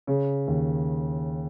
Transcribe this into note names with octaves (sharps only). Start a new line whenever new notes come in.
C#3
D#2